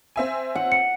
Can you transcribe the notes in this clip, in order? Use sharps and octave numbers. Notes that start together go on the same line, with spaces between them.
C4 E5 G#5
F#5
C#7